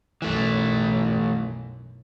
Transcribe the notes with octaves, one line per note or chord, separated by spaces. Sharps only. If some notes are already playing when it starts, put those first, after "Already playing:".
B1 F#2 E3 A3